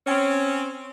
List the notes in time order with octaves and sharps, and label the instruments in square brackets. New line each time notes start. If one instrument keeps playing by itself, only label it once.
[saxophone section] C4 C#4